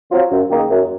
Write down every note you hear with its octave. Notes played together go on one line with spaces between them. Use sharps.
F#3 C4 F4
F#2
D#3 A#3 D#4 G#4
F#2